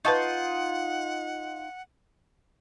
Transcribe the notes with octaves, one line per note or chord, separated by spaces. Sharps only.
D#4 F4 B4 F#5 A5 C#6